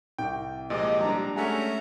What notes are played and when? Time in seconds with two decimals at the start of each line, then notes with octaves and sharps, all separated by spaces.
0.18 C2 G5
0.70 A#2 F3 G#3 G4 D#5
1.00 G3 D4 A#5
1.36 G#3 A3 C#4 E5 F#5 G#5 A#5